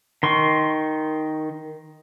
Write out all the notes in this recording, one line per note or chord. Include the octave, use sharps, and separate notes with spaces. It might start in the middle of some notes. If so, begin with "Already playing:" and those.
D#3 C6 C#6